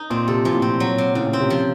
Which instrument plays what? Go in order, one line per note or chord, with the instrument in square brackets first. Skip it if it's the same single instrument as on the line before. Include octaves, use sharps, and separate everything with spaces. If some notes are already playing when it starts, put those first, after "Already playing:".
Already playing: [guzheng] D#4
[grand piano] A#2 [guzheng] C4
[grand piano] C3 [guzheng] A4
[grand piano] A#2 [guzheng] F3
[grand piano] A2
[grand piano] A#2 [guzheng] C4
[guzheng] F#3
C3
[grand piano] A2 [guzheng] C#3
[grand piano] A#2
[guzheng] C4
[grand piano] C3
[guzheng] F3